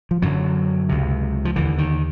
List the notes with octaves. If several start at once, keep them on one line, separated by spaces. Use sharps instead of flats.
F3
F#2 D3 F#3
C#2 C3
F3
D#2 D3 E3
D#3